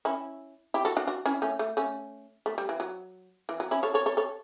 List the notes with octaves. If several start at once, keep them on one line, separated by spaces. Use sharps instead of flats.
C#4 E4
E4 G4
F#4 A4
D4 F#4
D4 F#4
C#4 E4
A3 C#4
A3
A3 C#4
A3
G3
E3
F#3
E3
F#3
C#4 E4
A4 C#5
A4 C#5
A4 C#5
A4 C#5